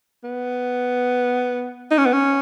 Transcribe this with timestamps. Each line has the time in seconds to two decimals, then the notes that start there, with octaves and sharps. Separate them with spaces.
0.24 B3
1.91 D#4
1.98 C#4
2.05 B3
2.13 C#4